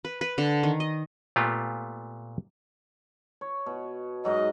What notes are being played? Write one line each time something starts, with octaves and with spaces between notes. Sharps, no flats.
B4
B4
D3
D#3
D#5
A#2 A3 B3 F4 G4
C#5
B2
G#2 F#3 D#5